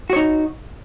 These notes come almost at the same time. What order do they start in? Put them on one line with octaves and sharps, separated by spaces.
F#4 C#5 D#4